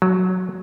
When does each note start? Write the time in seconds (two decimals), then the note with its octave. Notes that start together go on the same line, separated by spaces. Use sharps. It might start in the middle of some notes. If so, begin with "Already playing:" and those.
0.02 F#3